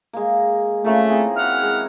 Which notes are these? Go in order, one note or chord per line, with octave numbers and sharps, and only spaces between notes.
G#3 A#3
F3 A3 A#3 C#4
C4 E4 G#4
E3 E4 F#4 F#5 F6
G#3